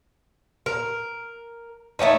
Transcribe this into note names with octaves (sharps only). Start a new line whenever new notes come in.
A#4
A3 B3 C#4 D#4